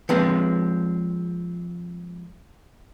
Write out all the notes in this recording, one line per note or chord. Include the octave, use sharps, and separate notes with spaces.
F3 G#3 C4 B4